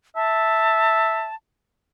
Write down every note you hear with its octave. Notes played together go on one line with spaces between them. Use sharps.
E5 A5